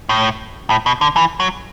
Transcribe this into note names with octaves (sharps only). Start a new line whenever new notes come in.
A2
A2
B2
D3
E3
F#3